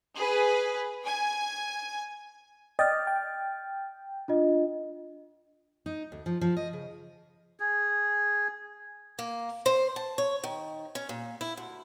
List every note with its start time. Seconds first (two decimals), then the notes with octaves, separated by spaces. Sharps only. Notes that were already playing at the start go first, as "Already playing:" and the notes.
0.17 G#4 B4
1.06 G#5
2.79 D5 D#5 G5 F6 A6
3.07 G5
4.28 D4 F4 D#5
5.86 D#4
6.12 D2
6.26 F3
6.41 F3
6.56 D#5
6.73 C#3
7.60 G#4
9.19 A#3
9.66 C5
9.96 A5
10.18 C#5
10.44 D#3
10.95 C#4
11.09 A#2
11.41 E4
11.57 D2